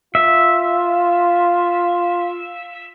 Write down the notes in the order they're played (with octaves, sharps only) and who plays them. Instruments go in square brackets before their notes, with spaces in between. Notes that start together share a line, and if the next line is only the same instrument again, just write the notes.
[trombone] F4 [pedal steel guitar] E5